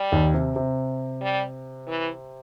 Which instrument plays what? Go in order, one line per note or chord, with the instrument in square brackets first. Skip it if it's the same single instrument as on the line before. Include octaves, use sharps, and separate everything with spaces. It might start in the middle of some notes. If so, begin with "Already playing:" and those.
Already playing: [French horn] G3
[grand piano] D#2 D#3
C3
C3
[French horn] G3
E3